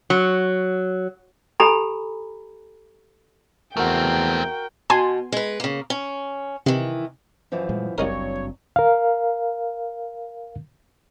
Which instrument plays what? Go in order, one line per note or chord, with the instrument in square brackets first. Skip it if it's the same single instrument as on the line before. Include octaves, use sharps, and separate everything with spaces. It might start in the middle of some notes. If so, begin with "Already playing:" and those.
[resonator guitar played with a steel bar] F#3
[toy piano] G4 A4 G#5 A#5 B5
[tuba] E2 [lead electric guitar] A3 C4 [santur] F#4 A#4 [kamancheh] G5
[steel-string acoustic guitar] B2 [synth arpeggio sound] G#5 A5 C6
[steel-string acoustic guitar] G#3 B4
C#3 A#3
C#4
[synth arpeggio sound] C3 [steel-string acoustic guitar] D#3 E3
[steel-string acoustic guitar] F#2 E3 F3
[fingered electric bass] A#2 G3 G#3
[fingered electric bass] F#1 C4 [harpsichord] C2 D#4 A#4 [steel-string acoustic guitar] G2 F#3 [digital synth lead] C#5
[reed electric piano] A#4 F5